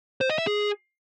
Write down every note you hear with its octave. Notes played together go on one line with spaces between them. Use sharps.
C5
D#5
E5
G#4